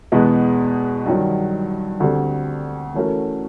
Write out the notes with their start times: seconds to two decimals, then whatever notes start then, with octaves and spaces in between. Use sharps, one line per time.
0.12 E2 B2 G#3 B3
1.06 G2 D#3 F#3
2.00 D2 D3 G3 C4
2.94 E3 A3 C#4 F#4 A#4